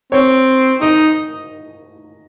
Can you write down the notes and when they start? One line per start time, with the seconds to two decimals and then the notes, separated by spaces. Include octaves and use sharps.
0.12 C4 C#5
0.81 D#4 D#5